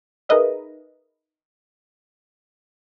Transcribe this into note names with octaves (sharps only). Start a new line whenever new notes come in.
D#4 G#4 A#4 B4 D#5 E5